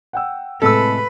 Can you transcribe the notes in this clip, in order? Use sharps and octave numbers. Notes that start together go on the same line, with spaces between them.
F#5 G5 E6
A2 C3 G#3 A4 B4 E6